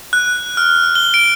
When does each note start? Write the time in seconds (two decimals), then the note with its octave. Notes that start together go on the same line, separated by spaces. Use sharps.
0.13 F#6
0.57 F6
0.95 G7
1.14 D7